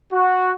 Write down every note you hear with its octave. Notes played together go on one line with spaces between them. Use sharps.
F#4